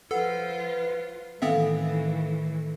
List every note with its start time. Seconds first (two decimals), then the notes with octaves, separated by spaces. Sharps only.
0.11 F3 F4 A4 B4 F#5
1.42 A2 D#3 E3 B3 C4 A4 E5 F5